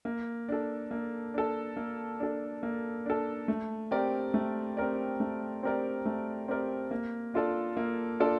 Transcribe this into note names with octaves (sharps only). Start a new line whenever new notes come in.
A#3
D4 A4
A#3
D4 A4
A#3
D4 A4
A#3
D4 A4
A3
C4 G4 A#4 D5
A3
C4 G4 A#4 D5
A3
C4 G4 A#4 D5
A3
C4 G4 A#4 D5
A#3
D4 F4 A4 D5
A#3
D4 F4 A4 D5